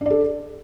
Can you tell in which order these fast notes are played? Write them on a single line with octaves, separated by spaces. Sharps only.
D4 D5 A4